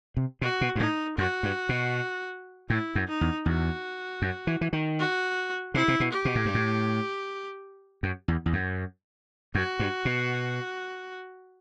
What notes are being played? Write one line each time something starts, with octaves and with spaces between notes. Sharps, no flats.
C3
B2 F#4
B2
G2
A2 D#4
F#2 F#4
G2
B2
A2 E4
F#2
D#4
E2
E2 F#4
F#2
E3
E3
D#3
F#4
C3 E4
C3
B2
G4
B2
A2
G2
A2
F#2
E2
E2
F#2
F#2 F#4
G2
B2